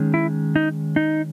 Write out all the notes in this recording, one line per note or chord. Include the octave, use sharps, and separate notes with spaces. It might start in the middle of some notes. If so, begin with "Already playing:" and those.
Already playing: D#3 G#3 C#4
E4
D#4
D#4